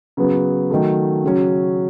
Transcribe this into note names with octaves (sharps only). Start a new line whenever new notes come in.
C#3 F#3 B3
D#3 F#3 A3
C#3 F#3 C#4